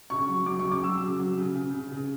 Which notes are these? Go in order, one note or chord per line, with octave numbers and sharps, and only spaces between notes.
C#3 C#6
F#3
F#3 D6
C#3 C#6
D6
F#3 E6
C#3
F#3
C#3
C#3
C#3
C#3